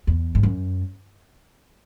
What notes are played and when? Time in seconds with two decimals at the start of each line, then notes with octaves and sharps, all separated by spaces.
0.07 E2
0.35 G#2
0.43 F#2